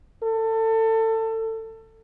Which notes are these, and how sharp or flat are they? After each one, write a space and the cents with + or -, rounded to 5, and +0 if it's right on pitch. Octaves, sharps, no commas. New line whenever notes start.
A4 +25